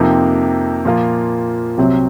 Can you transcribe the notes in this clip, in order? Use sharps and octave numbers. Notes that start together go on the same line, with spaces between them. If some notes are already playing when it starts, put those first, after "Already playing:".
Already playing: F2 C3 F3 A#3 D#4
A#2 F3 A#3 F4
C2 C3 F#3 C4